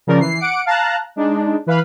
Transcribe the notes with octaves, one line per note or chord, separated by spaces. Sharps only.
C#3 F3 C#4 A#4 D5
E3 C7
F#5 D6 C#7 D7
F5 A5 A#5 F#6
G#3 D4 D#4
E3 B4 F5 B5